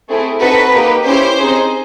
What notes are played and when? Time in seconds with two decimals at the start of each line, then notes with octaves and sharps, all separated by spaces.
0.09 A3 C4 E4 G#4
0.41 C4 D#4 F#4 A4 B4
0.74 A#3 D#4 G4
1.06 C#4 E4 G4 C5
1.39 C4 D#4 G#4